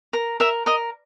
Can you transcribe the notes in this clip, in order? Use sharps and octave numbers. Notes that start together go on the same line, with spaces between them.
A#4
A#4 E5
A#4 D#5